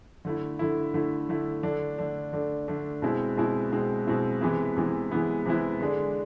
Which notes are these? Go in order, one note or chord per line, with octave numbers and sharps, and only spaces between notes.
D3 A3 E4
D3 A3 E4
D3 A3 E4
D3 A3 E4
D3 A3 D4
D3 A3 D4
D3 A3 D4
D3 A3 D4
B2 G#3 C4 E4
B2 G#3 C4 E4
B2 G#3 C4 E4
B2 G#3 C4 E4
C3 E3 G#3 B3 E4
C3 E3 G#3 B3 E4
C3 E3 G#3 B3 E4
C3 E3 G#3 B3 E4
D3 G#3 D4